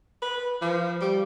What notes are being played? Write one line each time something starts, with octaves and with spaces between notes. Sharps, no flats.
B4
F3
G3